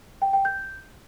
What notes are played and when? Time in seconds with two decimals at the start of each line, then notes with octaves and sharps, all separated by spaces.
0.22 G5
0.33 G5
0.45 G6